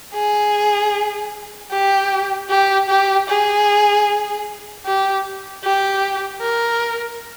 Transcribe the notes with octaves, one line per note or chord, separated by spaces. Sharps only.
G#4
G4
G4
G4
G#4
G4
G4
A#4